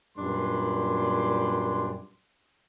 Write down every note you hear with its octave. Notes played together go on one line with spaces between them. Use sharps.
F#2 A#2 G3 D4 B4 C6